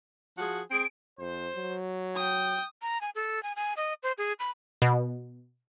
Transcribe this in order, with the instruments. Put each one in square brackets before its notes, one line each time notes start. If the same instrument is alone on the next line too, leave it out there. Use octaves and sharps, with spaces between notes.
[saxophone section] F3 F#4 G#4
[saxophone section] C4 G#4 [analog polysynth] D7
[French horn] F2 [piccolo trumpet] C5
[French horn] F#3
[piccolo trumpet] G5 [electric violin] D#6
[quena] A#5
G#5
A4
G#5
G#5
D#5
C5
G#4
B5
[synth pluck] B2